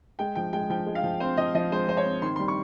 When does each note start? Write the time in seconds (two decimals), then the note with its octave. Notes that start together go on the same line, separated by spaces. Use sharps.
0.19 G#3 G5
0.35 F3 G5
0.53 G#3 G5
0.70 F3 G5
0.87 G#3
0.95 F5
1.03 F3
1.20 C4 C5
1.37 F3 D#5
1.55 F3 D#5
1.72 G#3 C5
1.88 F3 C5
1.97 C#5
2.06 C4
2.22 D#3 C6
2.36 G3 C6
2.48 C#6